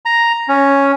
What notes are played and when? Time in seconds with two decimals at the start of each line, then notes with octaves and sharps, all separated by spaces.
0.05 A#5
0.48 C#4